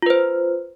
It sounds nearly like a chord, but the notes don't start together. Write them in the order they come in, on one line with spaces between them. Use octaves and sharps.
F4 B4 C5